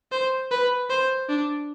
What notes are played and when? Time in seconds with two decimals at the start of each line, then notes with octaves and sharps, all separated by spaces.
0.12 C5
0.51 B4
0.90 C5
1.29 D4